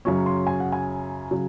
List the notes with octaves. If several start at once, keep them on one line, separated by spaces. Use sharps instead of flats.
F#2 C#3 F#3 C#4
C6
G#5
F#5
G#5
C#3 F#3